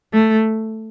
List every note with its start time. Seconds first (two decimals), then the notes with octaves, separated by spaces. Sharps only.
0.14 A3